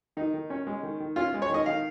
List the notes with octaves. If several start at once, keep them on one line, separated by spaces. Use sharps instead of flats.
D#3 D#4
D#3
C#4
G#3
D#3
D#3
C#4 F4
G#3
C#5
D#3 D#5
D#3 F5